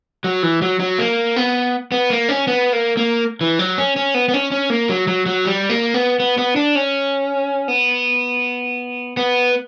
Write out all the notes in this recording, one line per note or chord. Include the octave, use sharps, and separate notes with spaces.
F#3
E3
F#3
F#3
A#3
B3
B3
A#3
C#4
B3
A#3
A#3
E3
F#3
C#4
C#4
B3
B3
C#4
C#4
A#3
F#3
F#3
F#3
G3
A#3
B3
B3
B3
D4
C#4
B3
B3